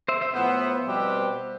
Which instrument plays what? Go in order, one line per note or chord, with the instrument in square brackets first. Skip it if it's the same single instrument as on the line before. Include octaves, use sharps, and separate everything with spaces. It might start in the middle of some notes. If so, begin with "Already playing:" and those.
[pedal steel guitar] C5 E5
C5 E5
[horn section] A2 F3 B3 [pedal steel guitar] C5 E5
[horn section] B2 G3 C4 G4 B4